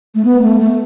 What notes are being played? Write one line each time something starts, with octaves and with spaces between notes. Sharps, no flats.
A3
B3
A3
A3